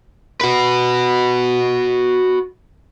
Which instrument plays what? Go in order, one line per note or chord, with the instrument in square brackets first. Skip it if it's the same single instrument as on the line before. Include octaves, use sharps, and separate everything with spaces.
[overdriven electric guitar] F#4 B4